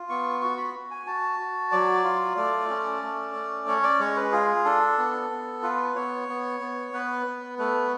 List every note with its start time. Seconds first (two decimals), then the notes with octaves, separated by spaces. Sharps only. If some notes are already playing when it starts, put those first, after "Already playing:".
Already playing: F4
0.09 B3 C#6
0.41 F#4 C#6
0.57 B5
0.74 F#4
0.91 G#5
1.07 F#4 A5
1.39 F#4
1.71 F#3 D5
2.04 F4
2.37 A3 D5
2.70 C#4
3.02 A3
3.35 C#4
3.67 C#4 C#5
3.83 D5
3.99 G#3 C#5
4.16 B4
4.32 F4 G#4
4.65 D4 A4
4.98 B3
5.30 B3
5.62 F4 B4
5.96 B3 C#5
6.28 B3
6.60 B3
6.93 B3 B4
7.26 B3
7.59 A3 B4